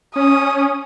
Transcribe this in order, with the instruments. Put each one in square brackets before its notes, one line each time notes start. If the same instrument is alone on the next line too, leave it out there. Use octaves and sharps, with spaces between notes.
[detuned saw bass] C#4 [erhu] D#6